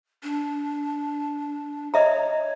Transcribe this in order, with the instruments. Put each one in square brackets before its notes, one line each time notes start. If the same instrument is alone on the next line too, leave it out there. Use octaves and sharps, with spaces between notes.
[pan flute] D4
[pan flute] C#5 [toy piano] D#5 E5 A#5